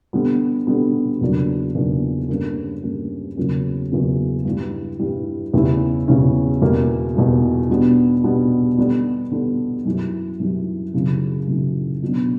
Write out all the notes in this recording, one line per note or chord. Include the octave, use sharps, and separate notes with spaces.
D3 G3 B3
D3 G3 B3
E2 C#3 F#3 A#3 D4
E2 C#3 F#3 A#3 D4
G2 D3 A#3 C#4
G2 D3 A#3 C#4
E2 C#3 F#3 A#3 C#4
E2 C#3 F#3 A#3 C#4
G2 E3 G3
G2 E3 G3
E2 C#3 G3 C#4 E4
E2 C#3 G3 C#4 E4
E2 B2 G3 A#3
E2 B2 G3 A#3
B2 G3 B3 D4
B2 G3 B3 D4
D3 G3 B3 D4
D3 G3 B3 D4
F#2 E3 G3
F#2 E3 G3
F#2 C#3 E3
F#2 C#3 E3
B2 F#3 B3 D4